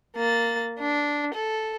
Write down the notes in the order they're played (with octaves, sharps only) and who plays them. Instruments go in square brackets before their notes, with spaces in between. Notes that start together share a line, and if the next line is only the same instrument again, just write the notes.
[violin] A#3 A6
D4
A4